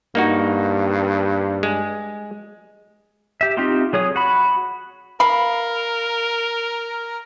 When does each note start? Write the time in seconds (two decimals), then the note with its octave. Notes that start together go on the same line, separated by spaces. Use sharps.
0.15 G2 A#3 D#4 F#4
1.63 G#3
3.41 G4 E5
3.57 C4 D#4 F4 G4
3.93 F#3 G#4 C#5 D#6
4.16 F#4 B5
5.20 A#4 F5 B5